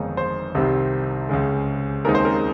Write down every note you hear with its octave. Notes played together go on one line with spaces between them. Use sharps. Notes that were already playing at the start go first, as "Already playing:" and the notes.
Already playing: G1 F2 D#3 G#3 D#4 C#5
C5
C2 C3 D#3 G3 C4
C#2 C#3 G#3
D#2 C#3 G#3 C4 D#4 A#4
C5
A#4